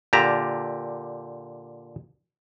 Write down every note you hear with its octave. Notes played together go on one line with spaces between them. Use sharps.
A#2 D3 G4 A5 A#5